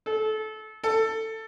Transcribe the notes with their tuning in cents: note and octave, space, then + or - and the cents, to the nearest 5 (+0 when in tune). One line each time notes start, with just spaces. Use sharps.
A4 -25
A4 +15